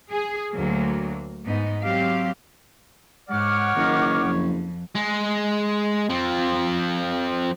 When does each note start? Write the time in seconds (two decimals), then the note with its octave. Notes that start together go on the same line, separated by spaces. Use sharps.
0.13 G#4
0.52 D2 F#3 A#3
1.45 G#2 B3 D#4
1.83 F#3 C4 G4 F5
3.29 G#2 C#5 F#5 D6 F6
3.77 F#1 D#3
4.26 F2
4.95 G#3
6.10 F3 C4